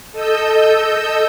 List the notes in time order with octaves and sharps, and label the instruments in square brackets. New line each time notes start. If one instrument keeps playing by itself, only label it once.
[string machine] A4 D#5 E6 G6